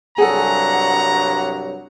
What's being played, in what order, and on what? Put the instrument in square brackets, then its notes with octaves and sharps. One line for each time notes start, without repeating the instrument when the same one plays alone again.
[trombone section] C2 G2 F#3 [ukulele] G#4 A4 [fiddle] F#5 [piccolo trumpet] A#5